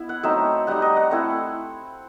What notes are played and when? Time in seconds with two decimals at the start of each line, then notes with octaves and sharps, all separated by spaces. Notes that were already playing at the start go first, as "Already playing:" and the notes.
Already playing: B3 E4
0.09 F#5
0.23 F#3 A3 C4 D#4 E5
0.67 G3 D#4 F#5
0.82 D#5
0.97 F#5
1.11 A3 C4 E4